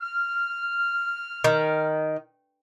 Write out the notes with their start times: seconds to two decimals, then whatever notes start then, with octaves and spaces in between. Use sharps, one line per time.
0.01 F6
1.44 D#3